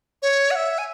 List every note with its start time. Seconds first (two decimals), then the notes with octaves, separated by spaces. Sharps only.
0.22 C#5
0.51 F#5
0.56 E5
0.78 G#5